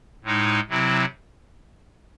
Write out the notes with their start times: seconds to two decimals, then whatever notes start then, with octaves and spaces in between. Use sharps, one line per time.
0.24 A2 G#3 D#4
0.69 C3 F#3 C4 E4